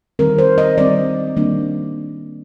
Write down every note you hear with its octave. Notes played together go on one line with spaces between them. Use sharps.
D#3 G3 C4 A#4
C5
D#5
D#3 G3 C4 D5
D#3 G3 A#3 D4